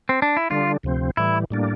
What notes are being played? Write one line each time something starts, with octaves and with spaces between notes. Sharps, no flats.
C4
D4
E4
D3 G3 D4 F4
D2 C3 F3 C4
A2 E3 G3 E4
A2 G3 A#3 D4